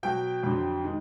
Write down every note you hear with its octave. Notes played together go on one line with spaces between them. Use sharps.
B2 F#3 G5
F2 D3 F#3
D#3 G#3